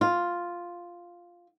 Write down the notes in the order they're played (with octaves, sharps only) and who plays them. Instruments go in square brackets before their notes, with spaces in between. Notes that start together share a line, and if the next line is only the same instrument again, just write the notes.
[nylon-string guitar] F4